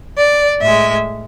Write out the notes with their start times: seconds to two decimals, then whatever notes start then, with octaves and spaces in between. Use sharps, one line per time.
0.17 D5
0.61 A2 G#3 E5